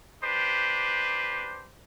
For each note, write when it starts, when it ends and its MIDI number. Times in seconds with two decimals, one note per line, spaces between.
0.23 1.69 62
0.23 1.69 67
0.23 1.69 71
0.23 1.69 72